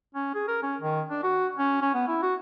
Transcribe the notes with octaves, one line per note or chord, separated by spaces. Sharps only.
C#4
G#4
A#4
C#4
D#3
D4
F#4
C#4
C#4
B3
E4
F#4